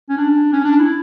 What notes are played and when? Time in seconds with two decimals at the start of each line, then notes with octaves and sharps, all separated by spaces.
0.09 C#4
0.17 D4
0.53 C#4
0.64 D4
0.79 E4